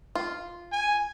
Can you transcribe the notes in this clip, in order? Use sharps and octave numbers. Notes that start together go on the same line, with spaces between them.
F4
G#5